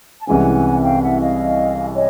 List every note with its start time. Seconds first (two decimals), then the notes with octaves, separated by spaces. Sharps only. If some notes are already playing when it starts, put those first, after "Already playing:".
0.21 A5
0.27 C2 C3 E3 G#3 C#4 F#5 G#5
0.83 F5 G5
1.02 E5 F#5
1.20 D#5 F5
1.95 C#5 D#5